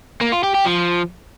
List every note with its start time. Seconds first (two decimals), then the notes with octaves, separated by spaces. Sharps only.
0.21 A#3
0.32 F4
0.43 G4
0.54 G4
0.65 F3